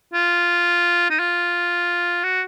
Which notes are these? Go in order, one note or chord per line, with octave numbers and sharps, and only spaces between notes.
F4
D#4
F4
F#4